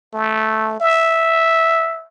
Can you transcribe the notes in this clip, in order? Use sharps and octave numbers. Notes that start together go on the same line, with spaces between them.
A3
E5